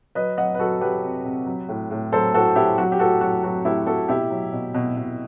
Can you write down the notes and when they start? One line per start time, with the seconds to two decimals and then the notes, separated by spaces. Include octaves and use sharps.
0.15 F#3 B4 D#5
0.37 F#3 D#5 F#5
0.54 B4
0.59 F#3 F#4 A4
0.81 F#3 G4 B4
1.03 C3
1.25 C3
1.46 F#3
1.69 A2
1.91 A2
2.12 F#3 A4 C5
2.34 A2 F#4 A4
2.56 F#3 E4 G4
2.78 F#3 F#4
2.92 G4
2.99 A2 F#4 A4
3.21 F#3 F#4
3.43 F#3 F#4
3.65 A2 E4 G4
3.87 A2 F#4 A4
4.08 B2 E4 G4
4.30 F#3
4.52 B2
4.74 B2
4.96 B2